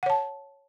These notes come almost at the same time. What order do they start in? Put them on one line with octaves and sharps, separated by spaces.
F#5 C#5 A5